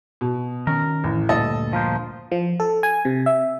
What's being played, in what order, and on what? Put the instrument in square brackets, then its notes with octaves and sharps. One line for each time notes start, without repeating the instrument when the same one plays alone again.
[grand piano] B2
[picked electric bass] D#3 C#4 [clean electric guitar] A#4
[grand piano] A1
[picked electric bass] D2 G2 A#2 [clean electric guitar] A4 [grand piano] D#5
[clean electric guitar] F3 A#4 C5
[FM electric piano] F3
A4
G#5
C3
E5